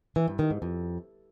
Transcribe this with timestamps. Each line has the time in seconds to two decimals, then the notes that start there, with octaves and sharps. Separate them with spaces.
0.16 E3
0.28 G2
0.39 D#3
0.50 G#2
0.62 F2